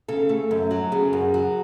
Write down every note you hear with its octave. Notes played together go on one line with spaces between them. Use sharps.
C#3 A4
A3
F#2
F#3
C#3 G#4
F#2
F#3